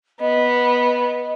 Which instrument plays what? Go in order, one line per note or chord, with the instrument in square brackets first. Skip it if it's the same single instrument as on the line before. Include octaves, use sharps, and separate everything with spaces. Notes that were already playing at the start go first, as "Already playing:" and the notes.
[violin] B3 [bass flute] D#5